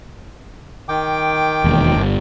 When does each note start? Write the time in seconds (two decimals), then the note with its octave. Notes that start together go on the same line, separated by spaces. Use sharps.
0.89 D#3 G5 D6
1.64 E1 D#2
1.96 G1